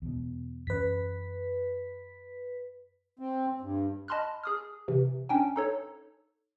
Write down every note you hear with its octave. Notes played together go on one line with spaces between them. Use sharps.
E2 B2
F#2 E3 C#4 B4 B6
C4
G2
D#5 A5 B5 C6 F6 F#6
G#4 D#6 F6
C3 E3
C#4 D4 G5 G#5
D#4 A4 C#5